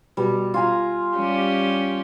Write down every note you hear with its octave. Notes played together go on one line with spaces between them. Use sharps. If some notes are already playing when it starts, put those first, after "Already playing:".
B2 G3
F4 G#5 A#5
G3 C#4 G4